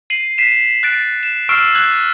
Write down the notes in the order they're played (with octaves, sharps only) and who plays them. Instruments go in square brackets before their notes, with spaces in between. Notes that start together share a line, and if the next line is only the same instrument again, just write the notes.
[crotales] C7 D#7 F#7
B6 C7 D#7 E7
F#6 A6 D7
E7
C#6 E6 F6 C7 D7 E7
F#6 G#6 F#7